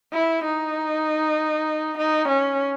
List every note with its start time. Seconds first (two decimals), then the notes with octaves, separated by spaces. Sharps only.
0.13 E4
0.44 D#4
1.98 D#4
2.28 C#4